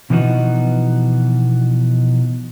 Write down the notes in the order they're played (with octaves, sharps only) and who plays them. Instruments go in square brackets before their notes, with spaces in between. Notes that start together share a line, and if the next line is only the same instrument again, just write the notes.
[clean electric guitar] B2 E3 F3 B3 D#4 F#4